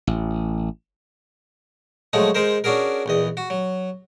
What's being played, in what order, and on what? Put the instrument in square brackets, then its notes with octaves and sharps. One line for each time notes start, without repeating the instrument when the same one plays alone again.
[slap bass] A1
[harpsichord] F3 F#3 G#3 A3 D#4
G#3 D#4 A#4 C5
C#4 D4 F#4 G#4 A#4
A#1 E2 D#5
F#4
F#3